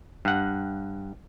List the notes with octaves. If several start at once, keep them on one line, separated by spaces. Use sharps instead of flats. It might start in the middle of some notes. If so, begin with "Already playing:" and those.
G2 F#5